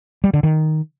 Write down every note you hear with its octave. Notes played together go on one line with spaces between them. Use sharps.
G3
D3
D#3